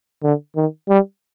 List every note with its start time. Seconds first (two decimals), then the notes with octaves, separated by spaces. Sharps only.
0.23 D3
0.56 D#3
0.89 G3